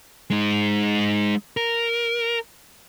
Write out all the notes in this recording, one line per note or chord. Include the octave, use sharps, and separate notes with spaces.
G#3 D#4
A#4